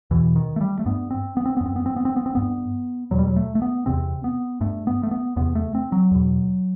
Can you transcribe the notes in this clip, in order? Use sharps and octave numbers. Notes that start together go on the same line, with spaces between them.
E2 B2 E3
D#3
A3
G3
A3
G2 B3
C4
B3
C4
B3
F#2
C4
B3
C4
B3
C4
B3
C4
G2 B3
E2 B2 F#3
G3
F#3
A3
A3
B3
E2 C3 C4
B3
G2 A3
B3
A3
B3
E2 C3 B3
A3
C4
F#3
E2 B2